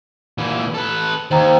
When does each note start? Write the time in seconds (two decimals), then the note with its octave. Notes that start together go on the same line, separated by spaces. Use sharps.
0.38 A#2 E3
0.74 A4 B4
1.31 D#2 C5 G5 A#5